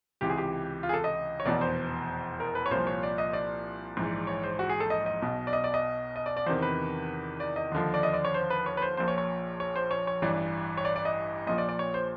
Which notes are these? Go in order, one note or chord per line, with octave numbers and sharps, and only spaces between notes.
C#2 C3 E3 G4
G#4
G4
F4
G#4
A4
D#5
C#5
F1 E2 B2 D5
C5
A#4
B4
C#5
C2 A#2 F3 C5
C#5
D5
D#5
D5
A#1 G#2 E3
C#5
C5
F#4
G#4
A4
D#5
D#5
B1 B2
D5
D#5
D5
D#5
D#5
D5
D5
E2 C3 D#3 C5
B4
D5
D#5
D#2 D3 F3
D5
D#5
D5
C#5
C5
B4
C#5
B4
C5
A#1 A#2 F3 C5
C#5
C#5
C#5
C5
C#5
C#5
A1 G2 E3 D5
C#5
D5
D5
D#5
A#1 A#2 F3 D#5
D5
D5
C#5
C5